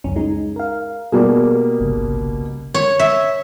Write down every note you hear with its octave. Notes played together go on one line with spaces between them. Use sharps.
C#2 F#2 C#4
G#3 D#4
A#4 F5
B2 G3 A#3 G#4 D5
G1 C2 C#3
C#5
E5